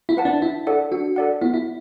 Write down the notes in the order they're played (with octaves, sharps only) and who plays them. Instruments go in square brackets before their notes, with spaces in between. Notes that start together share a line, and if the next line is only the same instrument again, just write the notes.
[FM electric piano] E4
[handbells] B4 F#5 A5
[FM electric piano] D4
[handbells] D4 [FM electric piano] E4
[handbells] A4 D5 F#5
[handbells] D4 [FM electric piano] F#4
[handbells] A4 D5 F#5
[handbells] B3 [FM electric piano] E4
[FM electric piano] E4